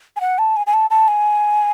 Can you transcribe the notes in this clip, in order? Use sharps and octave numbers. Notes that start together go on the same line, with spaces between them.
G#5
F#5
A5
G#5
G#5
A5
A5
G#5